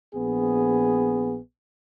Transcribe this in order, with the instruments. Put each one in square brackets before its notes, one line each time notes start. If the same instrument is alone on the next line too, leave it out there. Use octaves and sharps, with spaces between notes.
[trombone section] A#1 B3 G#4